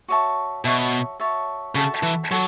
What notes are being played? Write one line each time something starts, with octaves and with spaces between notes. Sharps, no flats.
F#4 C#5 E5 A5
B2 F#4 C#5 E5 A5
F#4 C#5 E5 A5
C#3 F#4 A4 E5 A5
E3
F#3 F#4 A4